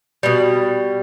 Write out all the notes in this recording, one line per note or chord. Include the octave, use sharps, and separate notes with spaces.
B2 G3